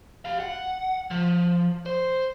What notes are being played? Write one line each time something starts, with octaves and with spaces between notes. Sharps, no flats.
G4 F5
F#5
F3
C5